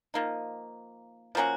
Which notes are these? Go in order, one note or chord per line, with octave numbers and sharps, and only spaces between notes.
F3 A#3 D#4
F3 A#3 C#4 F#4